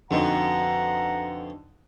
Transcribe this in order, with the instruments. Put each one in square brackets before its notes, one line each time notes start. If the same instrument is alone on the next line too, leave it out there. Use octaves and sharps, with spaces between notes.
[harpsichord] F2 B2 [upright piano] D3 D#4 [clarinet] F#5 [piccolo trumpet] A#5